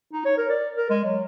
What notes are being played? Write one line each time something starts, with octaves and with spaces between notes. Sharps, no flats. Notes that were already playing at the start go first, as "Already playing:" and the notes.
D#4
C#5
A#4
D5
A#4
G#3
F#3